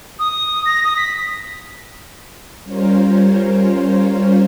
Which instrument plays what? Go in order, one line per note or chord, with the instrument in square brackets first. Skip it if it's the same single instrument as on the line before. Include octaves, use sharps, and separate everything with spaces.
[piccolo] D#6
A#6
D#6
B6
[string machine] G3 C#4 F4 A#4 C5 C#5